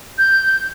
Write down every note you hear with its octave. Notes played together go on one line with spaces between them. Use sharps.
G6